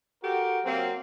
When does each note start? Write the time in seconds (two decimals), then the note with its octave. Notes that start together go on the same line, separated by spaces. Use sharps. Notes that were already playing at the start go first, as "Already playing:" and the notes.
0.23 F#4 G4 A4 A#4
0.65 F#3 A#3 C4